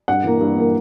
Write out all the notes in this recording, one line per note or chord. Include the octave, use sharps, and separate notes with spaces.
G2 F#5
E3 A#3
G2
E3 A#3